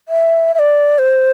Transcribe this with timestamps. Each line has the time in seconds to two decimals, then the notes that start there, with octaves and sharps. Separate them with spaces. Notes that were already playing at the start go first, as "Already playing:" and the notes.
0.09 E5
0.54 E5
0.59 D5
0.99 C5